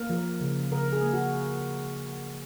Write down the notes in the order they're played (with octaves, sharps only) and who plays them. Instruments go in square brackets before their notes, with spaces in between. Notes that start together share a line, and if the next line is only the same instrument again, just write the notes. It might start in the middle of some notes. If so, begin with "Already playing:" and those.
Already playing: [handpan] A#3 A#4
F3
C#3
C#3 A#4
G#4
A#3
F#4